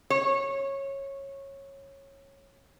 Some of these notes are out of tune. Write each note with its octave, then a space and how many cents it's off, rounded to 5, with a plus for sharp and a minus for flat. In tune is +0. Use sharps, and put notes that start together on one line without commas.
C#5 -15